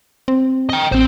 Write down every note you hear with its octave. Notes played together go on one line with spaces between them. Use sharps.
C4
D#5 G5
A1 C4 C5